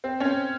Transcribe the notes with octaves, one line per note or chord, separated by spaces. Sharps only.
C4
C#4
C4